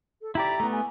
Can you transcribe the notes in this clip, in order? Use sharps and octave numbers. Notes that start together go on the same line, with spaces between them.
A4
E4 G4 D5 A#5
A3 B3
G#5